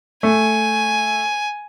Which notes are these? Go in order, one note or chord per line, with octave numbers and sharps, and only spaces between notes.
A3 G#5